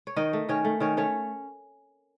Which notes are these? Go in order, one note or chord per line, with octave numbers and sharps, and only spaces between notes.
C#5
D#3 D#4 D#5
A3
D#3 C#4 C#5
A3
D#3 C#4 C#5
A3 C#4 C#5